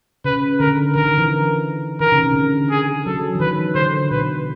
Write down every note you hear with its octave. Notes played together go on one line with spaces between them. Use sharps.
C#3 B4
D3 A#4
D#3 A#4
D3
E3
D#3 A#4
C#3
C3
D3
G#4
F#3 A4
E3
D#3 B4
D3 C5
B2 B4